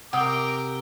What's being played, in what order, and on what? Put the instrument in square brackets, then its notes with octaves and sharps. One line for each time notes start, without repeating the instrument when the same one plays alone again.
[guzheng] C3 [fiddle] A#4 G5 [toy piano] F#5 D#6 [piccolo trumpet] D6